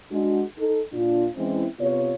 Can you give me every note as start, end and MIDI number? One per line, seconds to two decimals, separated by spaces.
0.11 0.42 56
0.11 0.42 62
0.11 0.42 66
0.58 0.80 63
0.58 0.80 69
0.93 1.26 46
0.93 1.26 62
0.93 1.26 65
1.36 1.66 52
1.36 1.66 56
1.36 1.66 60
1.36 1.66 61
1.36 1.66 64
1.79 2.13 48
1.79 2.13 59
1.79 2.13 65
1.79 2.13 73